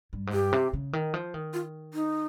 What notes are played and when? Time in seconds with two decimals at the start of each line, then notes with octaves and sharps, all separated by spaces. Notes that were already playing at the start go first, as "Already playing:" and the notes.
0.13 G2
0.27 G#2
0.33 G2 G4
0.53 C3
0.73 C#3
0.93 D#3
1.14 F3
1.34 D#3
1.54 F4
1.94 D#4